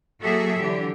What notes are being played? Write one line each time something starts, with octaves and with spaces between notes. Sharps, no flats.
F#3 A#3 F#4 G#4 A4 E5
D3 E3 F#3 G4